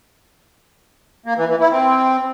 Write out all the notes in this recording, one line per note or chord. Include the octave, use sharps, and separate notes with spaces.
A#3
E3
E3
E4
C4